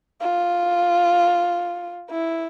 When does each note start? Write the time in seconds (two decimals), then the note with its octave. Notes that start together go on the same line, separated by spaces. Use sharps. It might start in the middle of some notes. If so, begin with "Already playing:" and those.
0.21 F4
2.11 E4